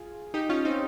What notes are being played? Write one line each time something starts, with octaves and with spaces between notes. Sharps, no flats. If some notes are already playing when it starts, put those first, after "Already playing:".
Already playing: F4 G#4
D#4 G4
C#4 F4
C4 D#4